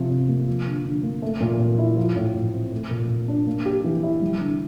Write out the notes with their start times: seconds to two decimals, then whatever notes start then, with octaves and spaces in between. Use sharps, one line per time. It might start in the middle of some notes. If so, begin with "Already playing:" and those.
Already playing: C3 F3
0.10 C3
0.29 A#3
0.48 F3
0.66 D3
0.85 D3
1.03 A#3
1.22 A3
1.41 A#2
1.60 A#2
1.79 E4
1.97 F3
2.16 A2
2.35 A2
2.54 C4
2.72 A3
2.91 A#2
3.09 A#2
3.28 D4
3.47 A#3
3.65 G4
3.84 E3
4.03 E4
4.22 G3
4.40 D3